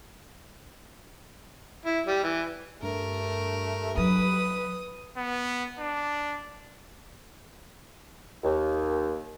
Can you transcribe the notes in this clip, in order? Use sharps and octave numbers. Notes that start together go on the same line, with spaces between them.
E4
G3
E3
G2 A3 A#4
F#3 B4 D#6
B3
D4
D#2